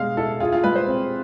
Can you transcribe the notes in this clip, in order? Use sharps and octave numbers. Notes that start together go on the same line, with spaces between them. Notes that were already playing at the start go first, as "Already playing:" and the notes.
Already playing: B2 G#3 F5
E4 A4
F4 G#4
F4
G#3 B4
C5
C4